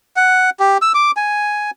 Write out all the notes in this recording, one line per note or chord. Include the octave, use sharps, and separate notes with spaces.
F#5
G4
E6
D6
G#5